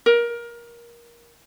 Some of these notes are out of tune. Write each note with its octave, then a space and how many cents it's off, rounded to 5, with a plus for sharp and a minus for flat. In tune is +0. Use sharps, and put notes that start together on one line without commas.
A#4 +20